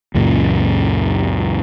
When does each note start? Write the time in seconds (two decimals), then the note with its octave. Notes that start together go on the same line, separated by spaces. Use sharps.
0.14 C#2 F#2 A#2 C#3